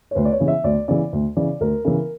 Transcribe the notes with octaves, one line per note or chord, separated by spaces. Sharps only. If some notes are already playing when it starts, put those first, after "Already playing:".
C#5
D2 B4
D5
C#5
C#3 E3
E5
D2 D5
C#3 E3 D5
D2
C#3 E3 D5
D2 A#4
C#3 E3 A#4